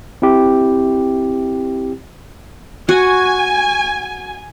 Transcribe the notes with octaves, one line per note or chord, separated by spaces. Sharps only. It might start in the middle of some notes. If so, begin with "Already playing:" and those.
C4 E4 G4
F#4 G#5